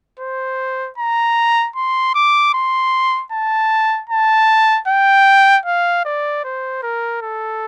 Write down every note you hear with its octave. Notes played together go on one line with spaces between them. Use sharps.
C5
A#5
C6
D6
C6
A5
A5
G5
F5
D5
C5
A#4
A4